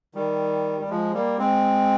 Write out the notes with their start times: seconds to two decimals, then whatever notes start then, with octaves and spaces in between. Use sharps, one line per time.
0.14 D#3 G3
0.80 G3
0.89 F3 G#3
1.14 G3 A#3
1.38 G#3 C4